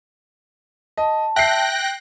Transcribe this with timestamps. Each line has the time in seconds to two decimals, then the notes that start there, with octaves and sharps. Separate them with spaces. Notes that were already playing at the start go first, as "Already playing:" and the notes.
0.97 D#5 A5
1.36 E5 G5 F#6 A#6 C7